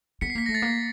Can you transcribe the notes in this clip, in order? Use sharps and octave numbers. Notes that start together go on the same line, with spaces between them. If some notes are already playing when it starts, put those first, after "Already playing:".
B3 B6 C#7
C7
A#3 B6
A3 A#6
A6
A#3